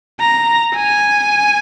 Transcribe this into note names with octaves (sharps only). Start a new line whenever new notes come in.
A#5
G#5